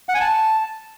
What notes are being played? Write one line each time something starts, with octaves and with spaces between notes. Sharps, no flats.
F#5
G#5
A5